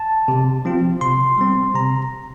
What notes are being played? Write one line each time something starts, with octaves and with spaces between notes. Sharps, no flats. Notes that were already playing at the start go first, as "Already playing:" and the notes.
Already playing: A5
C3
F3 C4 F4
C3 C6
G3 C4
C3 A#5